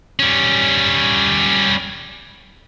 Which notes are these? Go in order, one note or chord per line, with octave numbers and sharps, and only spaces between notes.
G3 C#4